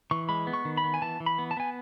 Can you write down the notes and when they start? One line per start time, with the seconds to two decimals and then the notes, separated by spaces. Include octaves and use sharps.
0.11 E3 C#6
0.29 G#3 B5
0.47 B3
0.54 C#6
0.65 D#3
0.77 B5
0.84 B3
0.94 G#5
1.02 E3 A5
1.20 E3
1.26 B5
1.38 B3
1.51 A5
1.57 B3 G#5